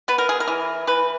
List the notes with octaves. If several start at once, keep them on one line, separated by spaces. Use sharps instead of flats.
B3 B4
A#4
G#4
A#4
E3
E3 B4